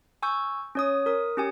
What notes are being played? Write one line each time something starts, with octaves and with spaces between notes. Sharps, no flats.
G#5 C#6 E6 G6
C#4 C#5 D#6
A#4 D#6
C#4 G4 G#5